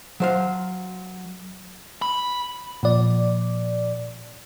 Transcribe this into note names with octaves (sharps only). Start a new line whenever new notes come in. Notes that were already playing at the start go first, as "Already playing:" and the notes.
F#3 C5 F5
B5
A#2 F3 D5